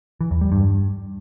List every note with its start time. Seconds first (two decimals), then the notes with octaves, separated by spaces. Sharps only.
0.21 E3
0.31 E2
0.41 G3
0.52 G2